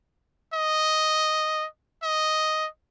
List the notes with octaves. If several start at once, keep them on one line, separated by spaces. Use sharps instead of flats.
D#5
D#5